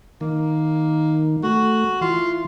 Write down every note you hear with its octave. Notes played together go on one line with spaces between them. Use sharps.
D#3 A#3
A3 F#4
E3 F4